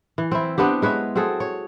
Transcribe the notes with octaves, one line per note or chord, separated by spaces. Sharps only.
E3
C4 E4
B3 C4 D4 G4
G#3 B4 C#5 E5
C4 F#4 G#4 A4
C#5